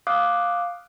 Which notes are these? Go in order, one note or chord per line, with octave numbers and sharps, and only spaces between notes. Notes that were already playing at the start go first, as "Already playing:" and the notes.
F5 D6 D#6 F#6